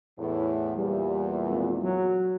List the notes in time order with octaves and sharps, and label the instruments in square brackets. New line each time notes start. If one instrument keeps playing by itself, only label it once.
[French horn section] E2 A2
[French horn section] E2 A#2 [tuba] G3
[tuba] G#1
F#3